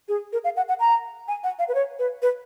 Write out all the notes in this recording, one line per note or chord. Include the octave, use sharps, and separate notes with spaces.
G#4
A#4
F5
F#5
F#5
A#5
G#5
F#5
F5
B4
C#5
B4
B4